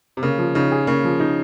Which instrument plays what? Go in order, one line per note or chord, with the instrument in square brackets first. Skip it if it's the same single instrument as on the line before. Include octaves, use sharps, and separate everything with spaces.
[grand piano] C3
[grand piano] C#3 [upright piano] A#3
[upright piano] F3
[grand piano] C#3 [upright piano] D#4
[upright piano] G#4
[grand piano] C#3 [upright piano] A#3
[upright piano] F3
D#4